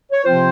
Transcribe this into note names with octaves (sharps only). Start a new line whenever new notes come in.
C#5
C3 F3 C4 F4 C5